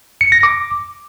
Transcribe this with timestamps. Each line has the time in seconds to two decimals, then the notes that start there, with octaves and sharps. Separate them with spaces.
0.21 C#7
0.32 A#6
0.43 D6